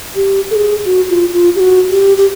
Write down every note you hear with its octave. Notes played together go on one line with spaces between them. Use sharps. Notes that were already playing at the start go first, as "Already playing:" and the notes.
G4
A4
G#4
F#4
F4
F4
G4
F#4
G4
G4